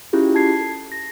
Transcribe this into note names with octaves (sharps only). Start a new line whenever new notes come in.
C#4 E4 F4 G4 G#4
A5 G#6 C7
A4
A#6